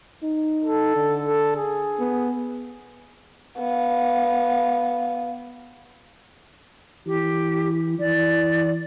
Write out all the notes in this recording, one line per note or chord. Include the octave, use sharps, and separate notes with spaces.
D#4
A4
D3
A4
G#4
B3
B3 F5
E3 G4
E3 D5